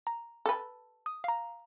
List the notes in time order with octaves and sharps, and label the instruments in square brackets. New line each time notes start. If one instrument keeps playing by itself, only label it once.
[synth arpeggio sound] A#5
[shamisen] A4 B4
[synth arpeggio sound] D#6
F5 A#5